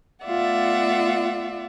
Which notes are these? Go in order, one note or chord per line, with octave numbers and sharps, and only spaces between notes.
A3 B3 F4 D5 E5 F#5